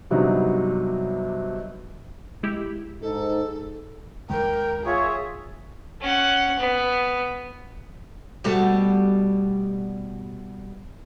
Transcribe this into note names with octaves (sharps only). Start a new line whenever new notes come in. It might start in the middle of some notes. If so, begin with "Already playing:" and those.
G2 C3 F#3 B3 D4 D#4
G#3 E4 G4
G#2 D#4 A4
D#2 D#3 G#3 A#4 G5
F4 G#4 C#5 E5
C#4 F#5
B3
B2 G3 A3